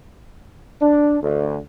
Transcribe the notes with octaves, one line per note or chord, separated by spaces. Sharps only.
D4
D2